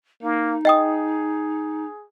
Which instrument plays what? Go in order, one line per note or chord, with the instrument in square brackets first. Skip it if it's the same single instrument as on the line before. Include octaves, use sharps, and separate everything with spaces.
[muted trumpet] A#3 [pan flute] D#4
[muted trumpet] G#4 [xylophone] D#5 G5 D#6